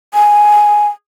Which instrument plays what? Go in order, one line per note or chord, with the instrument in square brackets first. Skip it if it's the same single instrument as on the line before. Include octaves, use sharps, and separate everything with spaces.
[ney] G#5